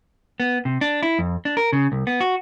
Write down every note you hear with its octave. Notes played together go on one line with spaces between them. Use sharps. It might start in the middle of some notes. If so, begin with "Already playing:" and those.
B3
C3
D4
E4
F2
D4
A#4
C#3
C2
B3
F#4